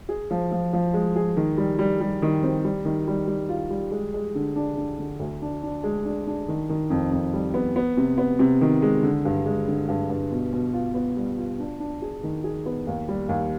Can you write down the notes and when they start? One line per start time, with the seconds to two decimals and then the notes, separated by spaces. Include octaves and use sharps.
0.09 G#4
0.31 F3
0.51 F3
0.73 F3
0.94 G#3
1.16 G#4
1.37 D#3
1.58 G3
1.79 G3
2.01 G3
2.22 D#3
2.43 C4
2.64 G3
2.85 D#3
3.07 G3
3.28 G3
3.49 F4
3.70 G3
3.91 G#3
4.14 G#3
4.35 D3
4.56 D4
4.77 D3
4.99 D3
5.19 D2
5.42 D4
5.63 D4
5.83 G#3
6.05 D4
6.27 D4
6.48 D#3
6.69 D#3
6.90 F2
7.12 F2
7.33 G3
7.54 B3
7.76 B3
7.97 C3
8.18 B3
8.39 C3
8.61 D#3
8.82 G#3
9.03 D3
9.25 G2
9.46 G#3
9.68 D3
9.89 G2
10.10 G2
10.32 B2
10.53 B2
10.73 F4
10.94 B3
11.17 G3
11.38 F4
11.59 D4
11.80 D4
12.02 G#4
12.23 D#3
12.44 G#4
12.66 B3
12.87 D#2
13.08 G3
13.29 D#2